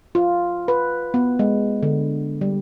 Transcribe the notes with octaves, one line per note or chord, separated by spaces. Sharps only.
F4
B4
B3
G#3
D3
G3